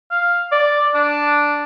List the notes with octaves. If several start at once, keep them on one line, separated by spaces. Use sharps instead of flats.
F5
D5
D4